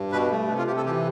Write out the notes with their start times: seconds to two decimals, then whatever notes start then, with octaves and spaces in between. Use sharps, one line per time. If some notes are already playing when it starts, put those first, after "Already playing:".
Already playing: G2
0.12 B2 B4
0.31 A3
0.49 C3
0.58 F4
0.67 C3 G4
0.77 A4
0.85 E3 G4